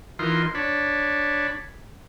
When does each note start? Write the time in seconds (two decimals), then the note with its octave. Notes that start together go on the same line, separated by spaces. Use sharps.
0.19 E3 D#4 F4 A#4 C6
0.55 D4 C#5 B5